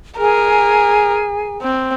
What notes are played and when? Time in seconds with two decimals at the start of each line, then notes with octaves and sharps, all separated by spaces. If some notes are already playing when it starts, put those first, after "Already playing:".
0.19 G#4 A#4 G#5
1.62 C4